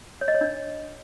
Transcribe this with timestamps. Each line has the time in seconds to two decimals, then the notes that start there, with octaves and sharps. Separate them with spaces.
0.21 C#5
0.28 D#5
0.34 C#5
0.41 D4